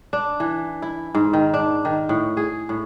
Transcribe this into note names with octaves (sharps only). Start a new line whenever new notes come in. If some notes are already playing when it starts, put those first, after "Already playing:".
D4
E3
E4
G#2
D#3
D4
D#3
A2
G#4
A2